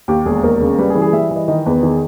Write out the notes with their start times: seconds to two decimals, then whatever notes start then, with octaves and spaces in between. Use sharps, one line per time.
0.08 D#2 G4
0.25 E1 G#4
0.43 D#2 A#4
0.61 C#3
0.78 G3 B4
0.90 G#4
0.95 E3
1.02 G#4
1.13 G3 E5
1.31 E3
1.36 D#5
1.48 D#3 D#5
1.66 E2 B4
1.83 D#3 G#4